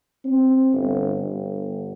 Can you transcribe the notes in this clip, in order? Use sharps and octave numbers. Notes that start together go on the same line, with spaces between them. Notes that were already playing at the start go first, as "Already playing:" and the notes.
C4
G1
G1